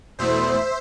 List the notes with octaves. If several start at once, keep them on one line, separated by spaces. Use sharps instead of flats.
E2 B2 A3 E4 C5 E5